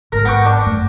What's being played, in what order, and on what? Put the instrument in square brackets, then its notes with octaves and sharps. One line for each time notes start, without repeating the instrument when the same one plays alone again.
[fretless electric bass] G#1 G#2 [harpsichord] A#4
[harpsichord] B3 G5 C#6
D4
[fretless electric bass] G#1 F#2 A3